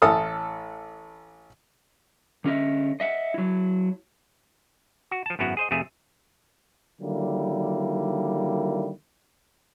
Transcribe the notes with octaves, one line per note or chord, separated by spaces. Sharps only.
A1 A4 A5 D#6 F6
D3 C#4 F#4 D#5 E5
D#5 E5 F#5
F#3 E4
F#4
F3 A5
G#1 F#2 B3 E4 F#4 F#5
G#4 C5 D#5
F2 C3 A3 G#4 E5
D3 D#3 F#3 G3 A#3 E4